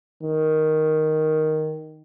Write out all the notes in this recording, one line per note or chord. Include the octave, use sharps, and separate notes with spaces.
D#3